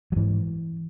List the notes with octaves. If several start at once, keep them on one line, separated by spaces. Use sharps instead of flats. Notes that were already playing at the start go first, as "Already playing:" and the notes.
F#3
G#2 E3